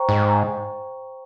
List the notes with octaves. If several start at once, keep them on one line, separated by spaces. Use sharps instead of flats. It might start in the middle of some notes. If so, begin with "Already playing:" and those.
Already playing: C5 G5 A#5 C#6
G#2